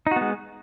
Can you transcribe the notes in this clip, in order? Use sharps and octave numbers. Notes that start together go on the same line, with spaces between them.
G#3 B3 D#4 F#4